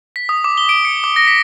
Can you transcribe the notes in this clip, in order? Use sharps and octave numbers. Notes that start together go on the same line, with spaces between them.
B6
D#6
D6
G7
D7
C#7
D6
A#6
B6